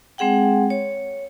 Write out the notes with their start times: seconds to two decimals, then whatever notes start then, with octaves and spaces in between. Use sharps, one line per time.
0.18 G#3 C4 G#4 F#5 G5
0.70 C#5